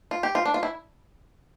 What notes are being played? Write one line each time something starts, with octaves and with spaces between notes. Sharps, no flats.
F4
G4
F4
D4
F4
E4